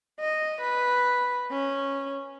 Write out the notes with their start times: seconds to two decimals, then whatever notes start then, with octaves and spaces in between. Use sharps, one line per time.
0.20 D#5
0.61 B4
1.51 C#4